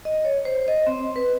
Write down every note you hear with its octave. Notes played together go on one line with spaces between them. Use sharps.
D#5
C#5
C5
D#5
C4
B4